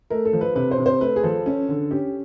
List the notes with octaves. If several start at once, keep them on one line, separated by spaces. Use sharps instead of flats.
A3 A#4
A4
F3
B4
C3 B4
C5
C3
C5
A3 B4
G#4
F3 A4
C#4
D3
C#4 G4